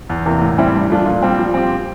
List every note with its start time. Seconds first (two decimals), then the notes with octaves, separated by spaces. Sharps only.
0.09 E2
0.26 C3 E3 A#3
0.41 A2
0.58 E3 G3 C4 E4
0.74 G2
0.90 F3 A3 D4 F4
1.06 A#2
1.22 G3 C4
1.39 F3
1.54 C4 G4